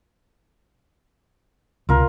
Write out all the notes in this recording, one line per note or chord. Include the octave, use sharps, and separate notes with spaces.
C#2 C3 F4 A#4